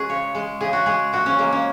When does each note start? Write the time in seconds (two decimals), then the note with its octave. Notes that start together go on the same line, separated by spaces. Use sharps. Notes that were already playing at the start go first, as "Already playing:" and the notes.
Already playing: G#3 C#4 F#4 G#4
0.09 C#3 C#5
0.35 G#3
0.61 C#3 G#4
0.73 F#4
0.86 G#3 G#4
1.13 A#2 F#4
1.26 C#4
1.38 G#3 A#3
1.53 C#4